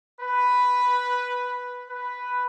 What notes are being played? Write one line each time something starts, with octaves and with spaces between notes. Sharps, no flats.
B4
B4